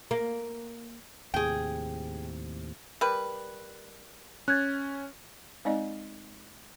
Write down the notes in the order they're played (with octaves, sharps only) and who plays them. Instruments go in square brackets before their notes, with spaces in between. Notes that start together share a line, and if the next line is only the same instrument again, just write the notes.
[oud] A#3
[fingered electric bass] D#2 A2 C3 [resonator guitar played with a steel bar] G#4 G5
[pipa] G3 B4 [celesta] A#4
[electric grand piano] C#4 [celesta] F#6 G#6 A6
[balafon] G#3 C4 D#4 D5 D#5